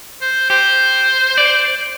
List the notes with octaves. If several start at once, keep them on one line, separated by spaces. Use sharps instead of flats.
C5
G4 C5
D5